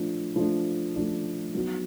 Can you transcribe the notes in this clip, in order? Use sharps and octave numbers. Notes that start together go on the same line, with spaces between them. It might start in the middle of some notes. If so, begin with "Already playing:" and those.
Already playing: F3 A3 D4
F3 A3 D4
F3 A3 D4
F#3 B3 D#4